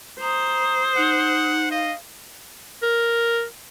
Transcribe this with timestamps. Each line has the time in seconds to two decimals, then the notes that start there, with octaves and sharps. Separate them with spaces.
0.21 C5 A#5 D#6
0.97 D#4 F#5
1.71 D#5 F5
2.83 A#4